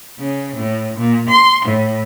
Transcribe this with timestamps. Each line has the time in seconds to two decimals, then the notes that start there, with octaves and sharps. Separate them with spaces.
0.18 C#3
0.57 A2
0.98 A#2
1.29 C6
1.66 A2